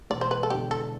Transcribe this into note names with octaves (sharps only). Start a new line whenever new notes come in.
E1 D5
C5
B4
A4
E2 D3 G4
A4